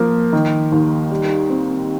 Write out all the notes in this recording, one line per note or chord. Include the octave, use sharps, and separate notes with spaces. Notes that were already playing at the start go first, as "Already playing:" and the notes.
Already playing: F3 A#3
D#3
D#2
G3
C4